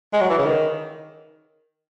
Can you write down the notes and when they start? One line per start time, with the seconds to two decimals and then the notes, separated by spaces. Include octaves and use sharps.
0.13 G#3
0.21 F#3
0.30 E3
0.38 C#3
0.46 D#3